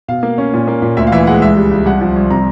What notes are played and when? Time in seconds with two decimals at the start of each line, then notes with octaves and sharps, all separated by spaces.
0.08 B2 F5
0.23 A#3
0.38 C#4
0.53 A#2
0.68 A#3
0.82 A#2
0.97 D2 E5
1.07 F5
1.12 E3 E5
1.27 G#3 F#5
1.42 C#2 E5
1.57 G3
1.71 C#2
1.86 C2 F#5
2.01 F3
2.16 C2
2.30 C3 A#5